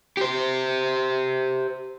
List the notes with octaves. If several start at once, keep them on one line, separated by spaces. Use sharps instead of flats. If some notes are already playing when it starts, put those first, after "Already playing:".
G4 C5